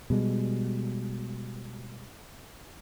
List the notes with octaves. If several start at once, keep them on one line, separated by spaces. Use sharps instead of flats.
B2 G3 G#3